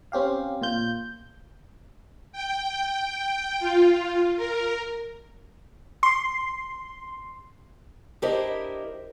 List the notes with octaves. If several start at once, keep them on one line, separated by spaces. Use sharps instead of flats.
C4 C#4 G4 F5
A#2 F4 G6
G5
F4
A#4
C6
D4 E4 G4 A#4 C5 D#5